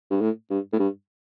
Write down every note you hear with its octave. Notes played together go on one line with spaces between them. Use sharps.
G2
A2
G2
A2
G2